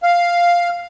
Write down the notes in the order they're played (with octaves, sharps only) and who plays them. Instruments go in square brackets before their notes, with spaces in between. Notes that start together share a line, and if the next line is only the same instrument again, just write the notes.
[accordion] F5